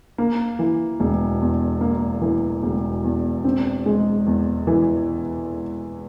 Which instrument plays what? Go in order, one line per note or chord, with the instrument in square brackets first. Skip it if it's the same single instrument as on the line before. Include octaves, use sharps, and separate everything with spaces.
[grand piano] A#3
E3
E1
E2
A#3
E3
E1
E2
C4
G#3
E2
E3